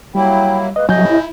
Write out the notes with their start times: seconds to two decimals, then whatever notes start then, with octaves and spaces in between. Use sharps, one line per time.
0.15 F#3 G3 A#3 E4 G5
0.76 G#3 A#3 B4 D#5
0.89 A2 C3 F#3 A3 D#5 G#5 G6
1.05 E4